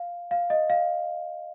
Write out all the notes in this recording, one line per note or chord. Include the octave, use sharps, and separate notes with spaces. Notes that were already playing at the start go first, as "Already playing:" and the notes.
Already playing: F5
F5
D#5
F5